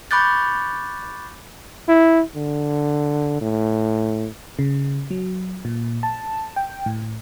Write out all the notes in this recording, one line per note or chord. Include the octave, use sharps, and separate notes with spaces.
B5 C#6 D6 F#6 G6 A6
E4
D3
A2
C#3
F#3
A#2
A5
G5
A2